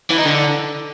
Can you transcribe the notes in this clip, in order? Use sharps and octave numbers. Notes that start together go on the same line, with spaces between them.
E3
D#4
D3